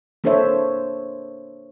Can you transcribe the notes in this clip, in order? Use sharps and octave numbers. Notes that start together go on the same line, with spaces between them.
A#3 D4 A4 C5 C#5 E5